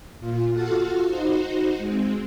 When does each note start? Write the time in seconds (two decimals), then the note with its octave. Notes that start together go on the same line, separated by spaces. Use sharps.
0.20 A#2 F4
0.52 F4 F#4 A4 F5 F#5
1.06 D#4 F#4 C5
1.77 G#3 C4